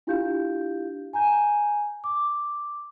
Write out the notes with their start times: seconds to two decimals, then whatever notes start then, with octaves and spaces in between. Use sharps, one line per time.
0.07 D4 E4 F4 G4 F5 G6
1.13 G#5 A#5 G6
2.04 D6